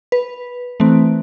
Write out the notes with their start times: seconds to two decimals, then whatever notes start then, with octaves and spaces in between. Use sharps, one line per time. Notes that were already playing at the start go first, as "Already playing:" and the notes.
0.12 B4
0.80 E3 A3 C4